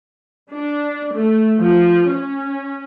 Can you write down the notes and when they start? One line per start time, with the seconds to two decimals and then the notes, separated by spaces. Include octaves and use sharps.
0.51 D4
1.14 A3
1.59 F3
2.09 C#4